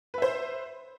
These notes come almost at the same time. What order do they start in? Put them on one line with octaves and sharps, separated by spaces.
B4 E5 C5